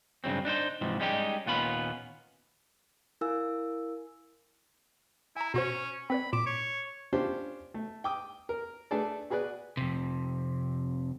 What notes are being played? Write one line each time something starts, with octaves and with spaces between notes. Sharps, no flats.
G2 C#3 F#3 C4
D4 D#4 A4 C5
G#2 C3 E3 F3
G3 G#3 C#4 D#4 F#4 G4
D#2 A#2 B3 C#4 F4 B5
E4 A#4 F5 G#5 E6
E4 G#5 A#5
B2 C#4 F#4 C5
C4 B4 D5 B5
A#2 C6 D6 E7
C#5
C#4 D4 F4 G4 C5
A3
G5 D6 D#6
A#4
A3 D4 G#4 A4 B4 D5
F#4 G#4 B4 D5 F#6
F2 C3